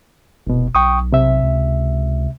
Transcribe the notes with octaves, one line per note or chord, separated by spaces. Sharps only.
F1 C2 B2
B1 G5 C#6 D#6
C3 E5
C#2